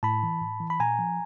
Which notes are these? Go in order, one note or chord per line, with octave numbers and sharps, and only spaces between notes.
A2 A5 B5
E3
A2
E3
B5
A#2 G#5 A#5
F3